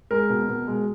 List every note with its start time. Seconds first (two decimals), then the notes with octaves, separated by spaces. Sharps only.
0.11 G#3 A#4
0.30 B2
0.49 B2
0.67 G#3